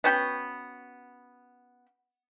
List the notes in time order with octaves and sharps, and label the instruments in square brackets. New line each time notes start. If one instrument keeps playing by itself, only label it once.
[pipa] B3 C#4 F#4 G5